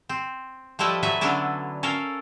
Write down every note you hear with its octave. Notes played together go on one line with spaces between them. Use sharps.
C4
F3 G3 A3 E4 B4 D#5
F#3 A3 F#4 B4 E5
D3 F#3 B3 C#4 D4 E4
C#4 A4 A#4 F5